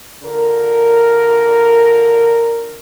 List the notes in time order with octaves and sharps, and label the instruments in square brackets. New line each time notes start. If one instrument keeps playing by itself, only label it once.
[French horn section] D3 F4 A#4